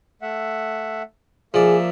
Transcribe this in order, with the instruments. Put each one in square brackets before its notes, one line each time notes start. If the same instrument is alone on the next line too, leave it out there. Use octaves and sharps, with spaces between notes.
[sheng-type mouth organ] A3 E5 F#5
[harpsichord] F3 D5 [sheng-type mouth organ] A#3 E5 [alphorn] G#4